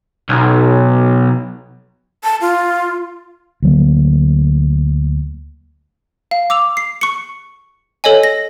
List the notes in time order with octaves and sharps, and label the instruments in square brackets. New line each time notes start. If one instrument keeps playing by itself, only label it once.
[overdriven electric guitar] B1
[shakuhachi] A5
F4
[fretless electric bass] D2 F#3 A#3
[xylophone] F5
D6 E6 F7
C7
C#6 C#7
A4 C#5 D#5 G#5
A#6